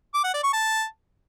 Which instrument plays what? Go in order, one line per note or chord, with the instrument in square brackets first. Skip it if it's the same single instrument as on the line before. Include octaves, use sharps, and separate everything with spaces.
[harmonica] D6
F#5
D5
C#6
A5